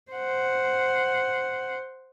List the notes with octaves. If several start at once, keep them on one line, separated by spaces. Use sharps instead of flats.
C5 F#5